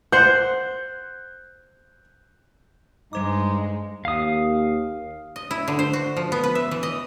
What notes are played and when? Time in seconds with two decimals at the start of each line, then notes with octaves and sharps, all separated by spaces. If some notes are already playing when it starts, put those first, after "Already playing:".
0.12 C5 F#5 F#6 G6
3.13 G2 G3 G#3 D#4 C5 D6
4.05 D#2 F5 D#6
5.36 D#5
5.51 E4
5.68 D3
5.79 C5
5.93 F#4
6.17 F3
6.32 B3
6.43 B4
6.55 E5
6.71 E3
6.83 D#5